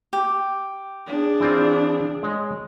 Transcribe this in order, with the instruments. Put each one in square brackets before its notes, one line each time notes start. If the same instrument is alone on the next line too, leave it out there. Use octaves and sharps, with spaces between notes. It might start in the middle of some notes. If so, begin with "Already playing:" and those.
[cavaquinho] G4
[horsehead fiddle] D4 G#4
[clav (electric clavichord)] E3 C4 F4
G#3 C#5 D#5